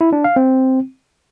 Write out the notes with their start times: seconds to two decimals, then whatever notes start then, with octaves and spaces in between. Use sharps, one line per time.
0.01 E4
0.13 D4
0.24 F5
0.36 C4